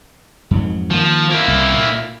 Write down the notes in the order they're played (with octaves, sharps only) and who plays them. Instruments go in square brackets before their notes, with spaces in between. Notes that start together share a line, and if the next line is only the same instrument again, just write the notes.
[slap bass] F2 G#2 F#3
[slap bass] D#3 A#3 [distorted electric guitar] F3
[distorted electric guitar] A#3 E4
[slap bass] C2
A#2